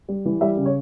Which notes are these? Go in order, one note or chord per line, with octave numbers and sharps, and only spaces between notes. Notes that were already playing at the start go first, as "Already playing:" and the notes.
G3
E3
G3 E5
C#3
C#5